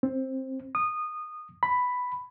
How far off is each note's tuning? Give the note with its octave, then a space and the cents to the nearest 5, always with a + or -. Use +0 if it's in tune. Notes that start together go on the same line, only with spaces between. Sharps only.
C4 +15
D#6 -20
B5 +5